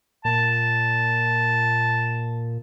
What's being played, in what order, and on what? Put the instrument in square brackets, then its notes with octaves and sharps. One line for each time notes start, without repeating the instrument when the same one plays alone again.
[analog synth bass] A#2 [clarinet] A5